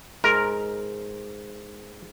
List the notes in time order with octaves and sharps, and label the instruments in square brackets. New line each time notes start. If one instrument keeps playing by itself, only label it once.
[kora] G#2 [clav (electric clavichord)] A#4